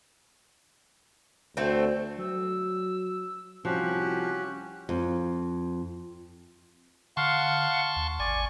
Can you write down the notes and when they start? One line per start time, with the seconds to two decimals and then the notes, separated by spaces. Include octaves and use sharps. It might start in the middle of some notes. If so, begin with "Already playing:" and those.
1.57 D2 A3 C4
2.19 F#3 E6
3.65 C2 F3 C#4 F#4 G4 F#6
4.89 F2
7.17 D3 F5 F#5 A5 C6 C#6
7.96 D#2
8.20 G#1 D5 G#5 C#6